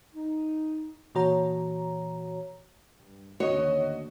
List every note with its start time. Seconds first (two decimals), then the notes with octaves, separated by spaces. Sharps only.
0.14 D#4
1.15 A#2 E3 F#4 C#5 A#5
2.97 G2
3.40 A1 D#2 D3 F#4 C#5 D#5